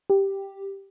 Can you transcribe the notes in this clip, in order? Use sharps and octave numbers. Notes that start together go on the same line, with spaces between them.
G4